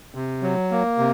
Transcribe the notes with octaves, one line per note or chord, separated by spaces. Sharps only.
C3
F#3
A#3
C3